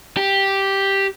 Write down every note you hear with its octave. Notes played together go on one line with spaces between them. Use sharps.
G4